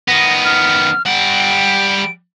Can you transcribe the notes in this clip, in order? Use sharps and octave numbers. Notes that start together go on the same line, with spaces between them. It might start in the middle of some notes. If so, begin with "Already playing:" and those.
D#3 B3 A#6
F6
G3 F#5 D7